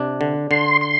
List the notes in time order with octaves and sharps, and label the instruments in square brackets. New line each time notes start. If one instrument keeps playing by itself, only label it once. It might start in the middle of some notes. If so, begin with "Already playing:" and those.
Already playing: [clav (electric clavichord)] C3 D4
D3
[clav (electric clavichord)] D3 [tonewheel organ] C6
[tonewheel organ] C6